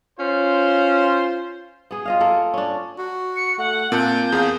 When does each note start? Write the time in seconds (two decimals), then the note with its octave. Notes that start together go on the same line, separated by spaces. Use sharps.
0.20 C#4 F4 C5
1.91 B3 G#4
2.06 F4 D#5 F5
2.20 A#3 A4 A#4
2.54 C#4 D4
2.99 F#4
3.36 C#7
3.58 A3 F#5
3.92 A#2 A#3 C4 A5 F#6 G6
4.32 E2 G#4 F5